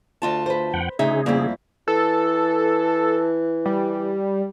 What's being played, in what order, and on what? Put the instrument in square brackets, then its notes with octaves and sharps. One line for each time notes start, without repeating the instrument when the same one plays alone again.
[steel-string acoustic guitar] D2 F4 A5
[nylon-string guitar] B4 C5
[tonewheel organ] F2 F#5 G5
[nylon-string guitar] D2 E5 [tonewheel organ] C#3 G#4 [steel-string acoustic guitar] D#4
[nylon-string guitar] F2 G3 E4 [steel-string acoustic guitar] A#3
[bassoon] E3 [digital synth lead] A4
[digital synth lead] G3